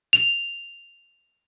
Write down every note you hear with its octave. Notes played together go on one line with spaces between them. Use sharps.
F7